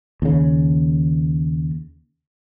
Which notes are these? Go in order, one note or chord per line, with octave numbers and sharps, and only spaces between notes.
D#2 C#3